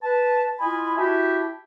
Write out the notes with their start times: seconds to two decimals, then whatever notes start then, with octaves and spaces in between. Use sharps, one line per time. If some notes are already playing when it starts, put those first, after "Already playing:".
0.03 B4 A5
0.61 E4 F4 D#5 G#5 B5
0.98 E4 F#4 G4 E5 A5